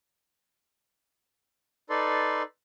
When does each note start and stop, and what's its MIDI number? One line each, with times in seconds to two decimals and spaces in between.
1.90 2.42 63
1.90 2.42 69
1.90 2.42 71
1.90 2.42 74
1.90 2.42 84